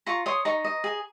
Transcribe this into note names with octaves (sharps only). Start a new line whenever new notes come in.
F4 A#5 C#6
C#5 C6 D#6
D#4 A#5 C#6
D#5
G#4